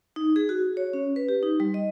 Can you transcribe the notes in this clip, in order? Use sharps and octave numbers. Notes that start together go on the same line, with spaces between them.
D#4
G#4
F#4
C#5
C#4
B4
G4
D#4
G3
D#5